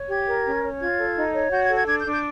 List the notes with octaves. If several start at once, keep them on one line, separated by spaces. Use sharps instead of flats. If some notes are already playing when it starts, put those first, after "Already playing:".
Already playing: C#5
G4 G#6
A#4
C#4
C#5
F4 G#6
A4
D#4
C#5
F#4 G6
G#6
A4
G#6
D4 G#6
G6
D4
G6